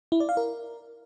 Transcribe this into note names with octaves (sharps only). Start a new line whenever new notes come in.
E4
D5
F5
A#4